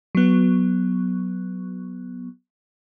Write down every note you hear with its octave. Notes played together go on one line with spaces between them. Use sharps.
F#3 B3